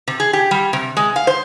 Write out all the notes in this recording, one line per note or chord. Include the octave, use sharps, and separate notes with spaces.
C3
G#4
G4
G3
C3
G#3
F5
C5